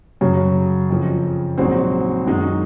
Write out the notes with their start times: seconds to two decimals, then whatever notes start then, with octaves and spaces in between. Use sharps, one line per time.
0.21 F#2 C#3 F#3
0.89 F2 C#3 F3
1.58 A#1 G#2 F#3 C4 F#4
2.27 F#2 D#3 G#3 D#4